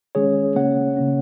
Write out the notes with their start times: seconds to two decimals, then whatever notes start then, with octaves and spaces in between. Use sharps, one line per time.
0.15 D#3 G#3 C#4 G#4 C#5
0.55 C#3 A#3 C#4 C#5 F#5
0.96 C#3 A#3 C#4